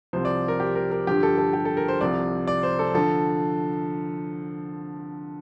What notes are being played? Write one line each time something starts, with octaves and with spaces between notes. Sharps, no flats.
C2 C3 F3 C5
D5
A#4
G4
A#4
A#4
G2 D3 F3 G4
A4
A4
G4
A4
A#4
C5
C2 C3 F3 D5
D5
C5
A4
D3 F3 A4